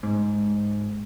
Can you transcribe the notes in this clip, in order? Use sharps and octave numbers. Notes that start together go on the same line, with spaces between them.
G#2